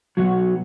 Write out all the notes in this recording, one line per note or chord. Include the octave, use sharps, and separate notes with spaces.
B2 F#3 F#4